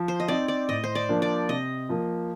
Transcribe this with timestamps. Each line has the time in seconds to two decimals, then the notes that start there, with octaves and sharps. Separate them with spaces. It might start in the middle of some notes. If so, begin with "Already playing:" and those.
Already playing: F3
0.08 C5
0.20 D#5
0.28 C4 D#4 D5
0.48 D5
0.68 A2 D#5
0.84 C5
0.95 D5
1.09 F3 A#3 D4
1.22 D5
1.49 C3 D#5
1.89 F3 A#3